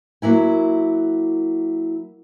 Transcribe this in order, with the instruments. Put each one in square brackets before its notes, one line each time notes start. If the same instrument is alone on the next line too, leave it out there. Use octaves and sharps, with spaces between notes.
[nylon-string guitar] F#3 A#3 E4 G#5